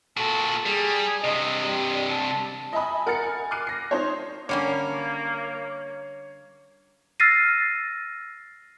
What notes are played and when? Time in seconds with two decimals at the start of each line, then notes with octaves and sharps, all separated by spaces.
0.17 A#2 F#4 A4
0.66 G3 G#4
1.24 G2 C3 D#5
1.64 G3
2.11 A5
2.73 D#5 E5 G#5 A5 B5 D#6
3.07 A#4 F#5 F6 A6 C#7
3.23 G#5
3.51 D6 F6 F#6 C7 D#7
3.67 A#6 C7
3.91 D#4 C5 C#5
4.49 D3 G3 A#3 C#4 C#5
7.20 E6 F6 A6 A#6 C7 D#7